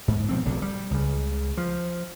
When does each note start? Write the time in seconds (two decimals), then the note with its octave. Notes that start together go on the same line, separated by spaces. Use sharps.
0.08 G#2
0.29 B2 F3 C4
0.45 F1 A#1 B2 D3
0.62 G3
0.91 C#2 C#3
1.57 F3